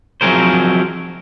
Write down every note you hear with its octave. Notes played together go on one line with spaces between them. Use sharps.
F3 F#3 C4 G#4 A#4 C5